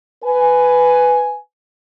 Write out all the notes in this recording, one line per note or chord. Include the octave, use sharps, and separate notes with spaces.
B4 G#5